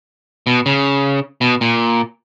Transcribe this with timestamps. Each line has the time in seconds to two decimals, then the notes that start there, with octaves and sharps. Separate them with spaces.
0.47 B2
0.66 C#3
1.41 B2
1.61 A#2